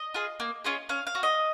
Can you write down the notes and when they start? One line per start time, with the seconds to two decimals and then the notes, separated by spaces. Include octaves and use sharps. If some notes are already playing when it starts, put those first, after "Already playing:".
Already playing: D#5
0.14 F4 G#4
0.40 A#3
0.64 C#4 F4 G#4
0.89 C#4 F5
1.07 F5
1.15 F#4
1.23 D#5